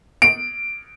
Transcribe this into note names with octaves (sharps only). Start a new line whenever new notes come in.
D7